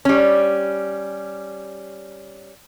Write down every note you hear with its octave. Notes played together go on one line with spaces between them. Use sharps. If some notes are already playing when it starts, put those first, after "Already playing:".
G3 C#4